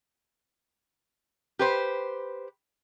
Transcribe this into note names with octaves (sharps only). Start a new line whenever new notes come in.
G4 B4 C5